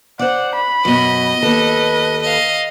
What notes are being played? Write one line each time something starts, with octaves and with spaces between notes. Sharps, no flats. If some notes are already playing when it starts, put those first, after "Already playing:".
C5 D5 F#5
B5
F#2 B2 D#5
D#2 A4 B4
D#5 F5